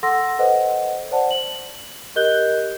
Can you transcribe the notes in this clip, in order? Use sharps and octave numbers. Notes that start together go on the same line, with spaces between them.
A4 F#5 C6 E6 A#6
A4 B4 C5 D#5 F#5
C5 D5 F#5 A5
F#7
G4 A#4 D#5 F#6 G6 G7